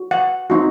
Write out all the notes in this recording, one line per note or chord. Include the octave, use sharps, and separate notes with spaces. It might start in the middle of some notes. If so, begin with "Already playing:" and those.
Already playing: F#4
F#5
C4 D#4 F#4